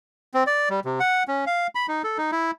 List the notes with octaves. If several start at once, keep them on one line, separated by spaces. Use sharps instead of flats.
C4
D5
G3
C3
F#5
C#4
F5
B5
D#4
A4
D#4
E4